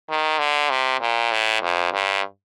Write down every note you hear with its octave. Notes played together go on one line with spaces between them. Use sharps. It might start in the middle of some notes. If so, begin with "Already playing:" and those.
D#3
D3
C3
A#2
A2
F2
G2